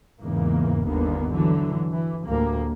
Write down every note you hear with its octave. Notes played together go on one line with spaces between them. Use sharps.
E2 G#2 C#3 E3 A#3
G1 D#2 D3 A#3 B3
D3 E3 F#3
E3
D2 A2 G3 A#3